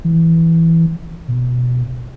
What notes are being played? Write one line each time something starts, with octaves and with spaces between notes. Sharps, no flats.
E3
B2